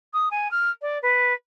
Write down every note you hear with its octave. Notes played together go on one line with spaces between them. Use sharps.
D#6
G#5
F6
D5
B4